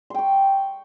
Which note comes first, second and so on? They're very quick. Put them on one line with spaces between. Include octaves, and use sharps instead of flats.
C6 G5 C#6